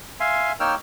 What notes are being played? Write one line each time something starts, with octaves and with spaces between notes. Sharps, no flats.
E5 F5 G#5 C6
A#3 D#4 C#5 G5 E6 F6